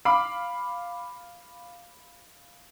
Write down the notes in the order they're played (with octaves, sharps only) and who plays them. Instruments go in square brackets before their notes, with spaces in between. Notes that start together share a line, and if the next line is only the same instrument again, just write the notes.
[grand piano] F5 B5 D6